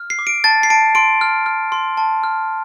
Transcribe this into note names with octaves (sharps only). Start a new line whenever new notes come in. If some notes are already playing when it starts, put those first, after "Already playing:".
Already playing: F6
C7
D6
D7
A5 A6
C7
A5 D7
C6 D7
F6
F6
C6
A5
F6